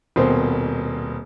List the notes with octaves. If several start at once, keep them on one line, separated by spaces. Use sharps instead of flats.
D#1 B2 A#3 C4 C5